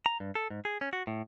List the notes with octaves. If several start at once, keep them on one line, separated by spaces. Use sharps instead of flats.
A#5
G2
A4
G#2
G#4
C#4
F#4
A2